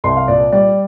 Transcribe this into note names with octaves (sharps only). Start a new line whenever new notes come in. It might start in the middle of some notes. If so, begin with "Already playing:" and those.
C2 C6
F5
A#2 D5
G3 D5